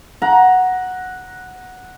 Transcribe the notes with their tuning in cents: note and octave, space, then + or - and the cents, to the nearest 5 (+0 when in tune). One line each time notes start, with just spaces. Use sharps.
F#5 -5 A#5 +15